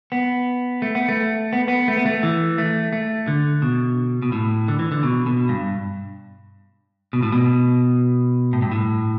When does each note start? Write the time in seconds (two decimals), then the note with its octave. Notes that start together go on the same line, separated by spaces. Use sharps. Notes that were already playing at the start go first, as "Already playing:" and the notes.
0.12 B3
0.82 A3
0.95 B3
1.09 A3
1.53 B3
1.68 B3
1.88 A3
1.97 B3
2.06 A3
2.23 E3
2.58 A3
2.93 A3
3.28 D3
3.62 B2
4.22 B2
4.32 A2
4.68 D3
4.79 E3
4.92 D3
5.03 B2
5.26 B2
5.49 G2
7.13 B2
7.23 A2
7.32 B2
8.53 A2
8.62 G2
8.71 A2